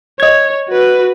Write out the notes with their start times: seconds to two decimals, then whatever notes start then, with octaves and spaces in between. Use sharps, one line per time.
0.20 C#5 D#5 G#6
0.68 F#4 B4